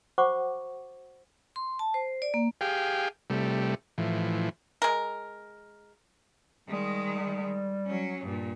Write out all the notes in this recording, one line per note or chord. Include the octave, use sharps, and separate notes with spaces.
F#4 C5 F#5 B5 C#6 D6
C6
A5
C5
D5
A#3
G4 G#4 F5 G5
C3 G3 A3
A2 E3 F3
G#3 A#4
D#3 G3 G#3
F#3 C#4
G2 A#2